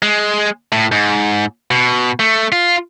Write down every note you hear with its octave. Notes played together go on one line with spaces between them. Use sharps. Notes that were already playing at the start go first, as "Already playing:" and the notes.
G#3
A2
G#2
B2
A3
F4